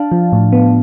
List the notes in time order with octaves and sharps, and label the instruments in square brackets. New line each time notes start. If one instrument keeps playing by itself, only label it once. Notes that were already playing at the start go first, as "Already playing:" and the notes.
Already playing: [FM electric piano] D4 F5 A5
F3
A2
B3